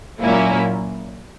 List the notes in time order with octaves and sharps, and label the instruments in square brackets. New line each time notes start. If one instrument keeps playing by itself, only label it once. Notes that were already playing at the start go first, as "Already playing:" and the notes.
[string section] A#2 F#3 A#3 C#4 E4